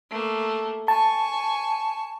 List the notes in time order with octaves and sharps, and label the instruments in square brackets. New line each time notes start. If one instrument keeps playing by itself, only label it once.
[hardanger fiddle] A3 A#3
[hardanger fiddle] G#5 C#6 [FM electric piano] A5